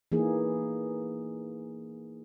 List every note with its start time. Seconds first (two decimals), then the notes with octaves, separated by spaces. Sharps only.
0.12 E3 A#3 D#4 G#4